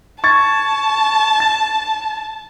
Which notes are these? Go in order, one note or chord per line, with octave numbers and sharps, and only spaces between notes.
A5 C#6 G#6 A6
A6